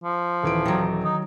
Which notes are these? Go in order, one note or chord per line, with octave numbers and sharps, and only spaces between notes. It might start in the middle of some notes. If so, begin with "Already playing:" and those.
F3
D#1 E3 D7
D#3 F#3
D#4